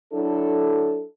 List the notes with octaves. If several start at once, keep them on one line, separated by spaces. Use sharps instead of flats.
F#3 D4 E4 A4